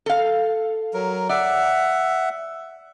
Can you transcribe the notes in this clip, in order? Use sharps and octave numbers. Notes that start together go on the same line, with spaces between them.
A4 F5
F#3 A#4
D5 E5 F#5